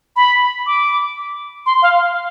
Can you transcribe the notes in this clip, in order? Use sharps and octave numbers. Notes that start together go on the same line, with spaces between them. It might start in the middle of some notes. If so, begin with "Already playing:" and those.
B5
D6
C6
F5